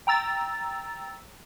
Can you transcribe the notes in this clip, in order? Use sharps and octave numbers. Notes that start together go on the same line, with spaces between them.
G5 A#5 E6 A6